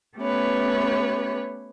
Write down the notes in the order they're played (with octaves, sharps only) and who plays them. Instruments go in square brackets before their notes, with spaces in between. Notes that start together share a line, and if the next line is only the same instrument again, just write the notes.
[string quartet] A3 B3 C#4 G4 B4 C#5